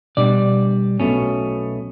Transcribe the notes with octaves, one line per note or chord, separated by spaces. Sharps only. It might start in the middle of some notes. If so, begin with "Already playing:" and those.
B2 G3 D4 D5
B1 B2 A3 C#4